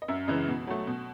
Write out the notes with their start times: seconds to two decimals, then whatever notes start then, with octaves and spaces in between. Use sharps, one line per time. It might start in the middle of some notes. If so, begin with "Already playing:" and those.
0.02 D#5
0.08 F#2 E5
0.28 C#3 E3 G#3 D#5
0.48 B2
0.67 F#3 A3
0.87 B2